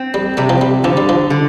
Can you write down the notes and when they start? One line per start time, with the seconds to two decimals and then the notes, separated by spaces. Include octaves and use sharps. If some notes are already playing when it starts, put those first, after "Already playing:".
Already playing: C4
0.14 G3
0.37 C3 G3
0.49 F3
0.61 G3
0.84 D3 F3
0.97 G3
1.09 F3
1.30 D3